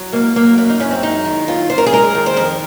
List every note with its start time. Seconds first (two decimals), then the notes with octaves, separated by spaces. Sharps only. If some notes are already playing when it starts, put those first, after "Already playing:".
Already playing: F#3
0.13 G#2 A#3
0.36 F#3 A#3
0.57 F#2 A#3
0.70 D#4
0.80 F#2 C#4
0.91 C4
1.03 G#3 D#4
1.25 D#3
1.48 F#2 F4
1.70 F#2 C5
1.78 A#4
1.86 G#4
1.93 G#3 A#4
2.15 D#3
2.26 C5
2.36 F2 A#4